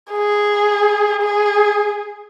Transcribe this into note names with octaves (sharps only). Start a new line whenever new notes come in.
G#4
G#4